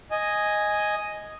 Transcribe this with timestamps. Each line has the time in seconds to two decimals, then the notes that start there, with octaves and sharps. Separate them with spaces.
0.11 D#5 G#5